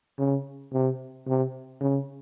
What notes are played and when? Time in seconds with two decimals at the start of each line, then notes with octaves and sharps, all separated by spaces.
0.19 C#3
0.73 C3
1.27 C3
1.81 C#3